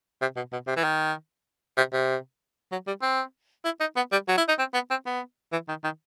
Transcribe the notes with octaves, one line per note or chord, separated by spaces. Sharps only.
C3
B2
B2
C3
E3
D#3
C3
C3
F#3
G3
C4
E4
D#4
B3
G3
F#3
E4
D#4
C4
B3
C4
B3
E3
D#3
D#3